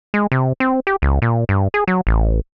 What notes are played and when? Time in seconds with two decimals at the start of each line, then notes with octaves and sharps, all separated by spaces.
0.14 G#3
0.32 C3
0.60 C4
0.87 G4
1.02 C#2
1.22 A#2
1.49 G2
1.74 G#4
1.88 F#3
2.07 A1